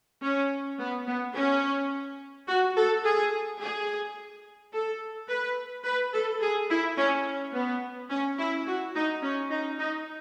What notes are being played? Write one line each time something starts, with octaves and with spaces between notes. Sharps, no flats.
C#4
B3
B3
C#4
F#4
A4
G#4
G#4
A4
B4
B4
A4
G#4
E4
C#4
B3
C#4
E4
F#4
D#4
C#4
D#4
D#4